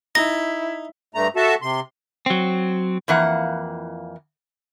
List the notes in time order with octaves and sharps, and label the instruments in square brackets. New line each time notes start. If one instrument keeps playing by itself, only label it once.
[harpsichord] D#4 [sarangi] E4 [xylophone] A#6
[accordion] G2 A3 A#5
F#4 A4 E5 A5
C3 C6
[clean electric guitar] F#3 C4
[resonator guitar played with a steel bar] F2 E3 A#3 F#5